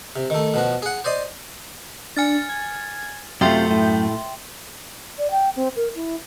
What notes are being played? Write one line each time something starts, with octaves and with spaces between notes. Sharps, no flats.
C3
D#3 A3
B2 F3 F#4
G#4 F#5
C5 D5 D#5 C6
D4 G#5 F6 A6
G#6
F#2 C3 A3 F4 E5 G5 C6 G6
A2
D5
G5
C4
A#4
E4